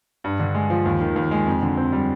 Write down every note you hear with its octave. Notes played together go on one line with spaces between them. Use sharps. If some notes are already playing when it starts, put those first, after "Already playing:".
G2
D3
G#3
F3
D#2
D#3
D#2
G#3
F2
D3
C4
G3